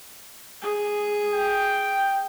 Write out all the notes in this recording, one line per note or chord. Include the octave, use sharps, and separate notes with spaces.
G#4
G5